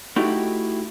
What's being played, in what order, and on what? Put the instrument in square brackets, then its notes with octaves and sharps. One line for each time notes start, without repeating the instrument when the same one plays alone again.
[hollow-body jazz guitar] A3 D#4 E4 F#4 G4